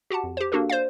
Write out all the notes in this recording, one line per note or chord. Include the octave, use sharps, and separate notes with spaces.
F#4 G4 F#5 A5
F2
G4 C5
A#3 D4 F#4 G4 A4 A#4
C5 D5 F5